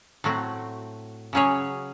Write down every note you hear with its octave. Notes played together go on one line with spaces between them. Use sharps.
A2 F#3 A3 C4 F#4
C#3 F#3 C#4 G#4 C#5